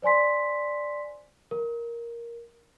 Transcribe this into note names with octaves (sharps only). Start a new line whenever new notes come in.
C5 D5 G#5 C6 B6
A#4